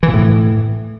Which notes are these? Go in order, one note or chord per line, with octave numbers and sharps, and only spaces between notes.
E3
A#2
A2